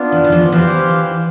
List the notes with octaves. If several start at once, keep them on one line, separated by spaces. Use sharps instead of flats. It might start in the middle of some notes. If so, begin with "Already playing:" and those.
Already playing: B3 D4 F4
E3
E3
F3
E3 G4 C5 F5